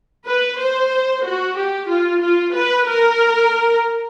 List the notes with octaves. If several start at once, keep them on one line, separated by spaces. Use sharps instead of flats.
B4
C5
F#4
G4
F4
F4
B4
A#4